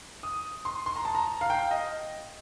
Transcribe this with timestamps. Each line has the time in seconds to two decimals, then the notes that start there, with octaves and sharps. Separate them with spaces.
0.23 D#6
0.65 C6
0.86 C6
0.96 A#5
1.05 A5
1.15 A#5
1.41 F5
1.50 G5
1.71 D#5